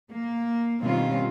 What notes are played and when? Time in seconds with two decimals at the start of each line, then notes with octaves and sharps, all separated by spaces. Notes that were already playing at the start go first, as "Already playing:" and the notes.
0.11 A#3
0.81 B2 D#3 G3 C4 C#4 F4